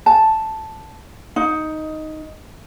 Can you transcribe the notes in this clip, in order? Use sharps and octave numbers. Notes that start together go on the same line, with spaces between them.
A5
D#4